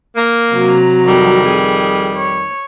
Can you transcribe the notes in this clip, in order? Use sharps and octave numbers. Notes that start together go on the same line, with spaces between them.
A#3
C3 F#3 A#5
F2 D#3 G3
G#4
C#5